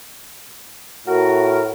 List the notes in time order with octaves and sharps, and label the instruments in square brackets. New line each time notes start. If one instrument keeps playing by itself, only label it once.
[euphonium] A2 [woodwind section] F#4 A#4